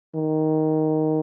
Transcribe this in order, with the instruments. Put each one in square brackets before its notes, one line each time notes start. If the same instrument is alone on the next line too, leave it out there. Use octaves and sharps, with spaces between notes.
[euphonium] D#3